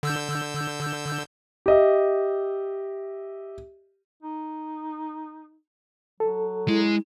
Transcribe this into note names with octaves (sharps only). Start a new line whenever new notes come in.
D3 E6 G6
G4 D#5 E5
D#4
F#3 A4
G#3 E4